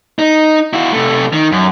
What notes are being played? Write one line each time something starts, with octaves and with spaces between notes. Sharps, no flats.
D#4
E4 F#4
C3 A3
D#3
F#2